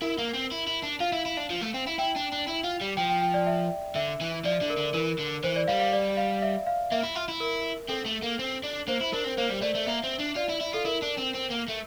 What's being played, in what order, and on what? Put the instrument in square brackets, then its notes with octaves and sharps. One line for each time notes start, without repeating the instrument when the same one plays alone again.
[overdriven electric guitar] E4 [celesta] A#4
[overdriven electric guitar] A#3
C4
E4
E4
D4
[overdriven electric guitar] F4 [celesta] F5
[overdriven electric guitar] E4
E4
D4
F3
A3
C4
E4
[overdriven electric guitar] E4 [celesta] G5
[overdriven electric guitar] D4
D4
E4
F4
G3
[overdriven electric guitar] F3 [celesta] G5
[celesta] G5
G5
D5
E5
[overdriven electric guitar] D3 [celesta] E5
[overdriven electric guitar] E3
[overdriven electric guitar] F3 [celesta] D5
[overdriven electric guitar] D3
[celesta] A#4
[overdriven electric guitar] D3
[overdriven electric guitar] E3 [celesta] A#4
[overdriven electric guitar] D3
[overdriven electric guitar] E3 [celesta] C5
[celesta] D5
[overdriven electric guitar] G3 [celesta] F5
[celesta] F5
D5
F5
E5
F5
[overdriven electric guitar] A#3 [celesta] E5
[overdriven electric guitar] E4
F4
E4
[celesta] A#4
[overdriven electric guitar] C4 [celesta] A4
[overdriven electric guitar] A3
A#3
C4
D4
[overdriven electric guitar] A#3 [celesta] C5
[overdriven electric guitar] E4
[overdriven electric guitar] D4 [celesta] A#4
[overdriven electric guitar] C4
[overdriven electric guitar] A#3 [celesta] C5
[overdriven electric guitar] G3
[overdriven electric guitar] A3 [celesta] D5
[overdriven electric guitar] A3
[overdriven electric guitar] A#3 [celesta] E5
[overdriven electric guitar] C4
D4
[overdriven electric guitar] F4 [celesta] D5
[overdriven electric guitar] E4
E4
[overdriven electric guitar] F4 [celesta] A4
[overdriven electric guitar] E4 [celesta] A#4
[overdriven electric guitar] D4
C4
C4
A#3
A3